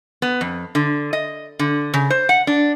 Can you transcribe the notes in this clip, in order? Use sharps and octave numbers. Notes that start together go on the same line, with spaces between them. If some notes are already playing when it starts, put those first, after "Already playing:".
B3
F2
D3
D#5
D3
C#3
C5
F#5
D4